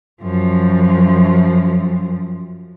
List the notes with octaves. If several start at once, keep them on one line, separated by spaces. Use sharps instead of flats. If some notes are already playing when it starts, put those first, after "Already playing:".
F#2 F3